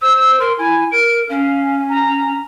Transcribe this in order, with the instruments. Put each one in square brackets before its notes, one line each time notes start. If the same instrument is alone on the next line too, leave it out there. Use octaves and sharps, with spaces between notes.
[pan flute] C5 [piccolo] E6
[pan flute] A#4 [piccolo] C6
[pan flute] E4 [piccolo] G#5
[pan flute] A#4 [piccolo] D7
[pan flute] C#4 [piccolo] F5
[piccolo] A#5